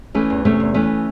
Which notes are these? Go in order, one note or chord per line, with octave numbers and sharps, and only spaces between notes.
E3 A3 C#4
E2
C3 A3 C#4
E2
E3 A3 C#4